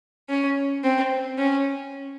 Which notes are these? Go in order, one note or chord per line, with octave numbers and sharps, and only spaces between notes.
C#4
C4
C#4